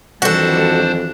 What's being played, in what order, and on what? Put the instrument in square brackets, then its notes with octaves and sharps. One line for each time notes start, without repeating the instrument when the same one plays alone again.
[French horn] F2 [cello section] D#3 E3 G3 [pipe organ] D4 C5 [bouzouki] F#4 A4